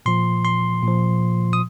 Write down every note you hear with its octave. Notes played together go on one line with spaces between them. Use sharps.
A#2 F3 C6
C6
A#2 F3
D#6